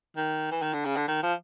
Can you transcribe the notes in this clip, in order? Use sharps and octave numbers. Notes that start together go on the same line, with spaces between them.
D#3
E3
D#3
D3
C#3
D3
D#3
F3